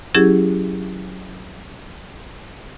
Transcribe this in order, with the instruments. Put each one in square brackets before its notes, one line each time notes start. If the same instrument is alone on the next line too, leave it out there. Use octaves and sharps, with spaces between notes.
[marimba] F#3 C#4 E4 G4 G#4 G#6